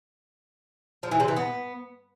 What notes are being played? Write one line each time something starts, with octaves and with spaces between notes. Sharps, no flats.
F3
E3
C3
E3
B3